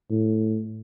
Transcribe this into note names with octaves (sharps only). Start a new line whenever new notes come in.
A2